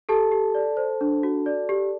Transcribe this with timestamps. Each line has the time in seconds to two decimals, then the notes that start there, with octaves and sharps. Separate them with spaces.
0.09 G4 A4 A5
0.32 G4
0.55 D5
0.77 C5
1.01 D4
1.23 F#4
1.46 D5
1.69 G4